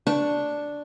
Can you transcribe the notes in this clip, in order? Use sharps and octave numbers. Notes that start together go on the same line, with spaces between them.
D4 C#6